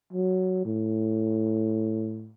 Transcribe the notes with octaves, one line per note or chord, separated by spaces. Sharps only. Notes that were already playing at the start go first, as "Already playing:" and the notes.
F#3
A2